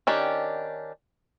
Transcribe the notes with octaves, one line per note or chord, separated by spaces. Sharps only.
D#3 C#4 D4 G4